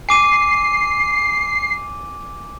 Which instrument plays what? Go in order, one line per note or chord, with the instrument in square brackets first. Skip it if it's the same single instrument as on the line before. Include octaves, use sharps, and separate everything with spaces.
[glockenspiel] G#5 D6 D#7 [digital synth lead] C7